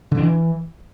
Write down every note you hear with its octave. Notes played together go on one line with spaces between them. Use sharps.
D3
D4
E3